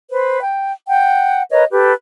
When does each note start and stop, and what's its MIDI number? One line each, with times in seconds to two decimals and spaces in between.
0.11 0.39 71
0.11 0.39 72
0.42 0.72 79
0.88 1.42 78
0.88 1.42 79
1.51 1.64 70
1.51 1.64 71
1.51 1.64 73
1.51 1.64 75
1.70 1.92 67
1.70 1.92 69
1.70 1.92 71